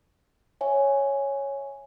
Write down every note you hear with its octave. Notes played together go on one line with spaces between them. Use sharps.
C#5 E5 G#5